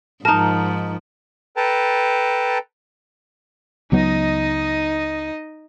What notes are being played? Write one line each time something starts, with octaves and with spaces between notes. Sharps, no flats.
G#2 F3 D#4 A#4 A5 A#5
A4 B4 G5 A5 A#5
C#2 F#3 B3 D#4 D#5